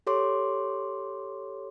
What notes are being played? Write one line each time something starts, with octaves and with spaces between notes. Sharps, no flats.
G4 A4 C#5 C6 D6